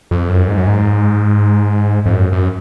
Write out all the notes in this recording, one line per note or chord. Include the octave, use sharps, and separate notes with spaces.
F2
F#2
G#2
F#2
G#2
F2
F#2
F#2